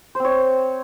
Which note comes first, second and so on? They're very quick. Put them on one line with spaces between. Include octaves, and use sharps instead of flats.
C5 C4 C#5